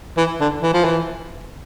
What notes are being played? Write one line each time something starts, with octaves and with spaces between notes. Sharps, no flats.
E3
D3
E3
F3
E3